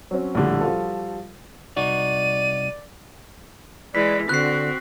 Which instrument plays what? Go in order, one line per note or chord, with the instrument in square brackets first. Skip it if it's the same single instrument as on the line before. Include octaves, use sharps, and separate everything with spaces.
[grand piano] F#3 C4 C#4
A#1 A2 D3 G3
F3 G3 F4 F#4 A4
[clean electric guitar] C2 D#4 F#4 [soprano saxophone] D5 [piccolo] D#7
[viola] E3 G#3 [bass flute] D5 [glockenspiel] B6
[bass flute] D3 [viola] C4 F#4 [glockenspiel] F#6 C7